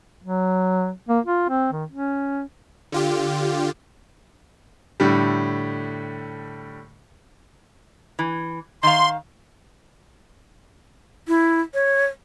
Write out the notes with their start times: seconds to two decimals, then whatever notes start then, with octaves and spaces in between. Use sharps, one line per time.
0.24 F#3
1.09 A#3
1.26 F4
1.49 C4
1.72 D#3
1.92 C#4
2.92 D3 F4 G4
5.00 A2 D3 G3
8.19 E3
8.83 D#3 F5 C6
11.28 E4
11.74 C#5